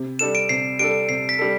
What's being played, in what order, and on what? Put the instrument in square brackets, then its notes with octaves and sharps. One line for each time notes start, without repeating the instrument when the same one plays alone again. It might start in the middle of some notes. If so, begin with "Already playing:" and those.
Already playing: [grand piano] C3
[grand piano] G3 D4 A4 [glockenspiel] E7
[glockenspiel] D7
[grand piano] C3 [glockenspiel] C7
[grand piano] G3 D4 A4 [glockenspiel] D7
[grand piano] C3 [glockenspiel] C7
[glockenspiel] B6
[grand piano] G3 D4 A4